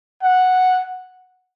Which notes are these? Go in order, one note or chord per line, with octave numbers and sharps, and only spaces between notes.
F#5